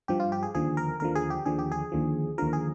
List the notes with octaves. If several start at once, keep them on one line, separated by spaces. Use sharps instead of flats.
G2 F3 G4
F4
G4
G#4
D#2 D3 F3 G#4
A#4
D#2 D3 F3 A#4
G#4
G4
D#2 D3 F3 G#4
G4
G#4
D#2 D3 F3
D#2 D3 F3 A#4
G#4